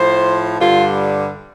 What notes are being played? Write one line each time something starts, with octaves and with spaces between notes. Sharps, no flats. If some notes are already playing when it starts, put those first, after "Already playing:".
Already playing: A2 F3 C5
G2 D3 G3 F4